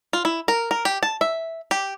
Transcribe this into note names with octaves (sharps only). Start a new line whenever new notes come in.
F4
E4
A#4
A#4
G4
A5
E5
G4